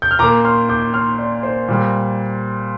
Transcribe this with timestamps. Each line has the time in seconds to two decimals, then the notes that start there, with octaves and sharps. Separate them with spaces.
0.02 G6
0.11 F6
0.19 A#2 A#5 D6
0.23 A#3
0.44 C6 F6
0.69 D6 G6
0.94 C6 F6
1.19 D5
1.43 C5
1.68 A#2 G3 A#3